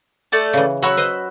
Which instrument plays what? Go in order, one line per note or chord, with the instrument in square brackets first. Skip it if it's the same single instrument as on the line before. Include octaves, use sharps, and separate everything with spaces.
[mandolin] A3 D5 A5
[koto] C#3 E3
[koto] F#3 C#5 [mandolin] F#4 B5 E6
[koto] B4 C5 D#5